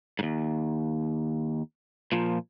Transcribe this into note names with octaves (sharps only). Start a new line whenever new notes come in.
D#2 G#2
A#2 F3